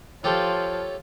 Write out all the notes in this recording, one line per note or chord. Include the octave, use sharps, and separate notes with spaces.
F3 F4 G4 A4 C#5